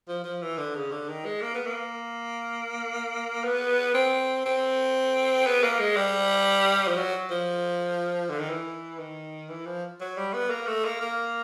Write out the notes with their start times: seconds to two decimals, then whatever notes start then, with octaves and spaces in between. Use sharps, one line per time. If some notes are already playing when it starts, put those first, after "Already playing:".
0.08 F3
0.24 F3
0.42 E3
0.58 D3
0.75 C#3
0.91 D3
1.09 D#3
1.25 G#3
1.42 A#3
1.55 B3
1.66 A#3
3.44 B3
3.94 C4
4.46 C4
5.46 B3
5.63 A#3
5.79 G#3
5.96 G3
6.87 F3
6.97 F#3
7.31 F3
8.29 D3
8.39 D#3
8.49 E3
8.99 D#3
9.50 E3
9.66 F3
10.01 F#3
10.18 G3
10.34 B3
10.50 A#3
10.67 A3
10.85 A#3
11.02 A#3